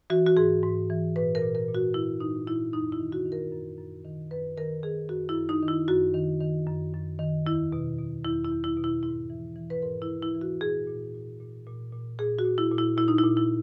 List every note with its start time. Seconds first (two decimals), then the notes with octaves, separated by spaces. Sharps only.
0.10 E3 F#4
0.27 F#4
0.37 G#2 G#4
0.63 G#2
0.90 E3
1.16 A#2 B4
1.35 A#4
1.42 A#2
1.55 A#4
1.68 A#2
1.75 F#4
1.94 A#2 E4
2.20 A#2 D#4
2.47 A#2 E4
2.73 F#2 D#4
2.92 E4
3.00 D#3
3.12 F#4
3.25 D#3
3.32 A#4
3.52 F#2
3.79 F#2
4.05 D#3
4.30 F#2 B4
4.57 D#3 A#4
4.83 D#3 G#4
5.09 F#2 F#4
5.29 E4
5.36 F#2
5.49 D#4
5.63 D#3
5.68 E4
5.88 F#2 F#4
6.14 D#3
6.40 D#3
6.67 F#2
6.94 F#2
7.19 D#3
7.46 E2 E4
7.72 B2
7.99 B2
8.24 E2 E4
8.45 E4
8.51 E2
8.64 E4
8.77 B2
8.84 E4
9.03 G#2 E4
9.30 E3
9.56 E3
9.70 B4
9.82 G#2 A#4
10.02 E4
10.09 G#2
10.22 E4
10.35 E3
10.41 F#4
10.61 A#2 G#4
10.87 A#2
11.14 A#2
11.40 A#2
11.66 A#2
11.93 A#2
12.19 A#2 G#4
12.39 F#4
12.45 A#2
12.58 E4
12.72 A#2
12.78 E4
12.97 A#2 E4
13.08 D#4
13.18 E4
13.24 A#2
13.37 E4